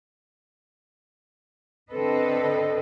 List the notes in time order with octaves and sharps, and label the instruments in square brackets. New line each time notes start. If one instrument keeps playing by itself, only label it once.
[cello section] D3 C4 A4 B4 D#5